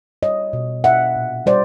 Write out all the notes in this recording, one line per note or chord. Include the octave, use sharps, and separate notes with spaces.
G3 C#5 D#5
B2
D4 E5 F#5
A#2
G3 C5 D5